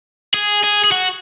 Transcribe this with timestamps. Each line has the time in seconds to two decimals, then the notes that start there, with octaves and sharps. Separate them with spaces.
0.34 G#4
0.63 G#4
0.84 G#4
0.92 F#4